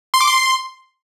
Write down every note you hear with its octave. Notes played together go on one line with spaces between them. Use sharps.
C6
D6
C6